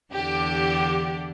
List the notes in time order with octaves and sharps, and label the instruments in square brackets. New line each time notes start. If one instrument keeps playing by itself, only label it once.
[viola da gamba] E2 D3 D4 [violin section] G4